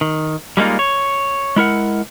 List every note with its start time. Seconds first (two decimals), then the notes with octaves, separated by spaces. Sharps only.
0.01 D#3
0.57 G3 G#3 A#3 D#4 F4
0.79 C#5
1.56 G#3 E4 A#4 F#5